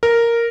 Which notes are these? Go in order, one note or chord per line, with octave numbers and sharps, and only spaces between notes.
A#4